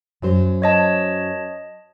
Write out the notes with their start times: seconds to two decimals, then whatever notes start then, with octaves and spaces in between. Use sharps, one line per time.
0.22 F#2 F#3 C5
0.62 C#5 D#5 A5